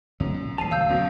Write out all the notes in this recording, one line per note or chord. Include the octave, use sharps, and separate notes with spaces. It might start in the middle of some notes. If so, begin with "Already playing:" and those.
C#2 F#2 B2 A3
A#2
D#1 E3 G3 A5 C7 D#7 F7
D2 F5 E6 G6
F#2 B2